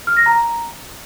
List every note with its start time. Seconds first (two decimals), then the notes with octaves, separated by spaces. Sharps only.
0.07 F6
0.17 A#6
0.26 A#5